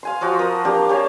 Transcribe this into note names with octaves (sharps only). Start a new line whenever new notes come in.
F5 G#5 C6
F3 F4 F#4 G5
A#4 D#6
A#3 D4 G4 F5
G4 C#5 F5 A5